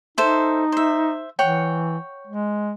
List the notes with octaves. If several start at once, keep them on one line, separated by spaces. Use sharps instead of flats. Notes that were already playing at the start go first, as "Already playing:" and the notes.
D#4 A4 C5 E5
C5 E5
E3 C#5 F#5 G5
G#3